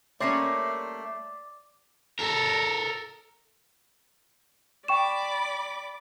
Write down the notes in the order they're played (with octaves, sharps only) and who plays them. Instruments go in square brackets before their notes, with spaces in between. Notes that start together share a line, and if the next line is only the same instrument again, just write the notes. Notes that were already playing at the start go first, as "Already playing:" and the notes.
[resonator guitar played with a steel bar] G3 A#3 C#4 [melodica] A3 [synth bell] C#5 C6 C7 [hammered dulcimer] D5
[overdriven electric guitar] A4 A#4
[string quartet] D5 B5 D6 [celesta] G5 C#6 E7